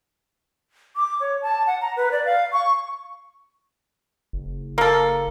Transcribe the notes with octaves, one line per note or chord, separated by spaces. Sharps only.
D6
C#5
A5
F#5
A#5
B4
D5
F5
C#6
F#1
A#3 A4